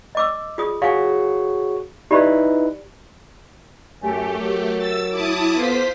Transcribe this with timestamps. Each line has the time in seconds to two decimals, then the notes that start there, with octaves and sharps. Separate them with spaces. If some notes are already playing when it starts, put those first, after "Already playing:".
0.15 D#5 D6 E6
0.58 F4 G#4 D#6
0.82 F#4 G#4 C#5 F5 G#5
2.11 D#4 E4 G4 B4 D5 B5
4.02 F#2 A3 G4 G#5
4.39 F#3 A#4
4.79 E6 A6
5.10 E4 A5 D6 D#6
5.56 B3 F4 A4 C5 B6